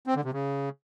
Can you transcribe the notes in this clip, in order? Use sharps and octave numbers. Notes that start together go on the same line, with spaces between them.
C4
D3
C3
C#3